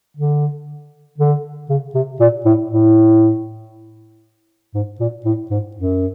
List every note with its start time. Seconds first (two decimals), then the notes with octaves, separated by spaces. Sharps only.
0.17 D3
1.18 D3
1.69 C#3
1.94 C3
2.20 A#2
2.45 A2
2.71 A2
4.74 G#2
5.00 A#2
5.25 A2
5.50 G#2
5.76 F#2